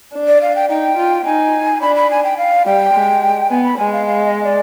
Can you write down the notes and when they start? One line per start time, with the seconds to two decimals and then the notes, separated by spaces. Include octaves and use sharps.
0.14 D4
0.28 D5
0.42 F5
0.56 G5
0.69 D#4 G5
0.97 F4
1.25 D#4 G#5
1.81 D4 B5
1.96 B5
2.10 G#5
2.24 G5
2.38 F5
2.66 G3 G5
2.94 G#3
3.50 B3 G#5
3.64 B5
3.78 G#3 G#5
3.92 F5
4.06 F5
4.25 D#5
4.44 D5